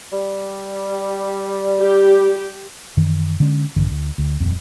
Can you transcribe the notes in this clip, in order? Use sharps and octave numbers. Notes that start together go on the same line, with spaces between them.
G3
G4
F#2 D#3 E3
D3 G#3 C#4
A#1 G2 D3 E3
D2
D2
D#1 F2